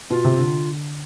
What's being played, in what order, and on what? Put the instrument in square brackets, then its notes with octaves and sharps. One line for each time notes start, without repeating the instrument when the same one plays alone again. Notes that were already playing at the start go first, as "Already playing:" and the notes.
[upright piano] B2 [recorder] F4
[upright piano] C3
D3